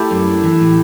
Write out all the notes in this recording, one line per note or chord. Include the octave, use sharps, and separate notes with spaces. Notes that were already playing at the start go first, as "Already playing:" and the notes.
Already playing: A3 E4 G4 A4
F#2
D4
E3
A2